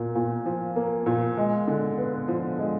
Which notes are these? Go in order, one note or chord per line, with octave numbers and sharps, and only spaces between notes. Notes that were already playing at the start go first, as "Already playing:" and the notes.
Already playing: A#2 A#3
A#2
F3
A#3
A#2
G#3
D3
B3
F3
G#3